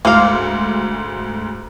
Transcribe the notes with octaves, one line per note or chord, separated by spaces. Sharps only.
D2 G#2 A#3 F5